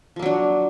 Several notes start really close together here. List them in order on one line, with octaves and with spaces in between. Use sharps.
F3 A#3 F#3 D4